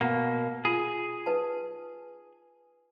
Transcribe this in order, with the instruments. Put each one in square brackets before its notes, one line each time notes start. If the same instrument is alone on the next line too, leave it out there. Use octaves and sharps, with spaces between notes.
[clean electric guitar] B2 A#3 [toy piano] F#5
[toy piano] F4 [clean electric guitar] G#4
[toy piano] D#4 B4 A5